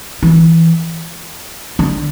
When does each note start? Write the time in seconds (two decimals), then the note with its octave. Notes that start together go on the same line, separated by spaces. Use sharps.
0.23 E3
1.79 D3